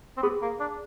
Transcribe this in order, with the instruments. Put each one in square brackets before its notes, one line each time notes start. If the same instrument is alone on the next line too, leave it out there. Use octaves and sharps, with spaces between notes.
[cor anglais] C4
[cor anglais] B3 [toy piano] G#4
[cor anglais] A#3
D4